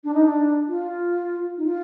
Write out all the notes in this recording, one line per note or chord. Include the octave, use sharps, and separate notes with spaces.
D4
D#4
D4
F4
D#4
F4